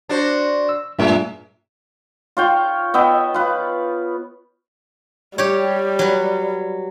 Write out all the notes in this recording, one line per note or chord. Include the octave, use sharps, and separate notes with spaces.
D4 F#4 C5
E6
G2 A#2 G#3 E5
F4 C#5 G5
B3 D#5 E5 G5
F4 B4
G3 G4 C#5
F#3 B4